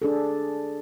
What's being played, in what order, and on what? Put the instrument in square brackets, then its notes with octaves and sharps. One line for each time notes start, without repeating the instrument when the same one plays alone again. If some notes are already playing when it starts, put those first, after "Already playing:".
[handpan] D4 G#4 A4